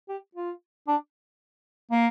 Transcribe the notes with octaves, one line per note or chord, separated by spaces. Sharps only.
G4
F4
D4
A#3